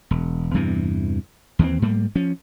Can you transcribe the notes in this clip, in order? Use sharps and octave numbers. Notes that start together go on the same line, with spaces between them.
E1
E2 G2 C3 E3
D#2 E3 G3 C4
G#2 G3 A#3
F3 C#4